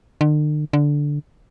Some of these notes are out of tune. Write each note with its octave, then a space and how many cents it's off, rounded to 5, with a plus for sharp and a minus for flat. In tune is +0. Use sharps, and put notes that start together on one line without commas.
D3 +45
D3 -5